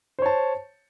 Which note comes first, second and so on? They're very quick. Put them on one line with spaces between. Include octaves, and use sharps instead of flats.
C5 C#5 A5